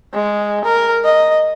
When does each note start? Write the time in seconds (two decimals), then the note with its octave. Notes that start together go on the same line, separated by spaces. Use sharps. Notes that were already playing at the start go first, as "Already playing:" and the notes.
0.14 G#3
0.65 A#4
1.05 D#5